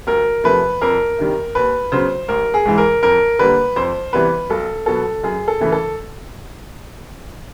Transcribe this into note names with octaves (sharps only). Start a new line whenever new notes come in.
D2 A#4
C3 F3 A3 B4
F2 A#4
C3 D#3 G3
D#2 B4
C#3 F#3 B3 C5
A1 A#4
G#4
G#2 E3
A#4
F2 A#4
D3 G3 A#3 B4
F2 C5
C3 E3 G3 B3 B4
B1 A4
B2 F#3 B3 A4
F#2 G#4
A4
C#3 E3 A3
A4